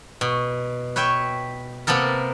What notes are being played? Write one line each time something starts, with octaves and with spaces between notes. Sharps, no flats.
B2
B4 C#5 E5 G5
C3 A#3 B3 A4 A#4